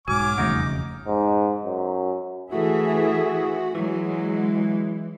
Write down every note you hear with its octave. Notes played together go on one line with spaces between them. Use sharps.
B1 G#2 F#3 F#4 G#5 D6 F6
E1 F2 C#3 E3 G3 A3 D#4
G#2
F#2
E3 A3 F#4 G#4 E5
E3 F#3 G#3